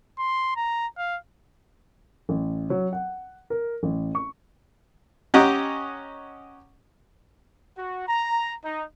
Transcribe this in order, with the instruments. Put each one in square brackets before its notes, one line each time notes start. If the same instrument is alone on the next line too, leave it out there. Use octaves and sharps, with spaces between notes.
[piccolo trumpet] C6
A#5
F5
[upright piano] A1
F#3
F#5
A#4
A1
C#6
[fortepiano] C#4 G4 D#5 F#5 A#5
[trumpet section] F#4
A#5
D#4